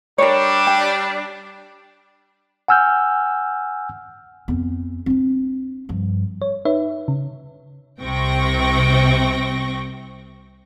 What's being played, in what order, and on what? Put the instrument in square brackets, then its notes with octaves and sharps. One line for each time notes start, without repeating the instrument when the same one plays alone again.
[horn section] G3 D4 [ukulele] A#4 C#5
[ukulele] G5
[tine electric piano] F#5 G#5 E6 F6 G6
[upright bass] F2 B3
C4 D4
G2 F3
[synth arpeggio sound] C#5
D#4 B4 C#5 E5
C#3
[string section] C2 C3 C4 G5 C#6 A#6